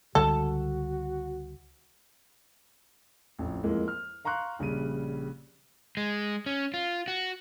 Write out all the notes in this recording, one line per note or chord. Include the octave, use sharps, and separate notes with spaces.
C#2 D3 G3 F#4 A4
A1 F2
F2 A2 E3 G#3 A#3
F6
F5 A#5 C6 C#6 F#6
A#1 C#3 G3 D#7
G#3
C#4
F4
F#4